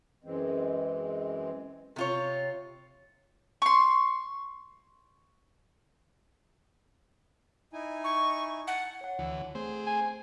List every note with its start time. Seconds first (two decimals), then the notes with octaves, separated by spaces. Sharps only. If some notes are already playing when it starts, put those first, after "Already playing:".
0.24 F#2 E3 G#3 C4
1.96 C3 F4 C#5
3.62 C6 C#6
7.73 D#4 E4 G#5
8.04 C#6
8.67 F#5 G#5 A5
9.01 C#5 F#5
9.19 D2 E3
9.55 A3 C4 G#4 C5
9.87 G#5